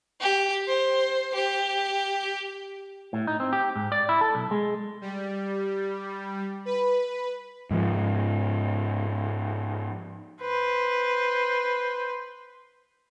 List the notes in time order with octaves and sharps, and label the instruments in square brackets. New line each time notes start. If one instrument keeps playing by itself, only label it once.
[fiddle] G4
C5
G4
[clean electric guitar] A2
D#4
C4
G4
G#2
D5
E4
A4
B1
G#3
[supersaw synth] G3
B4
[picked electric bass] G#2 F3
[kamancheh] B4 C5